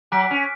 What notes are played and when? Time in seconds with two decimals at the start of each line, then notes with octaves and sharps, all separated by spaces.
0.12 F#3 G#5 D6 F#6 B6 D7
0.31 C#4